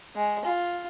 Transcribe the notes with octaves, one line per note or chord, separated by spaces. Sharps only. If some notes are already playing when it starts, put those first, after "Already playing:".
G#3
F4